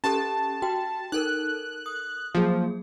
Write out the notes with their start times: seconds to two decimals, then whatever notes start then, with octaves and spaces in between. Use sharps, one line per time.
0.04 C#4 G4 A4 A5
0.62 F#4 G5
1.12 D#4 A4 A#4 F#6
1.86 D#6
2.35 F3 F#3 A#3 G#4